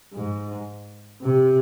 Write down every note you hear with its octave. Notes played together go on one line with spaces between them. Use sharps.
G#2
C3